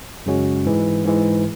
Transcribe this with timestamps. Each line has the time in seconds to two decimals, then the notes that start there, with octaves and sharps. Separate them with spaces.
0.26 F#2 C#3 G#3 C#4 F#4
0.65 G#2 E3 G#3
1.04 G#2 E3 G#3